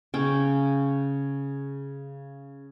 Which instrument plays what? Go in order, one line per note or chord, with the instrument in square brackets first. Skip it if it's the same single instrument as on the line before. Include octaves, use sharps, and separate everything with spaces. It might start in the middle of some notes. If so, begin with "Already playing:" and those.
[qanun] C#3 C#4 G5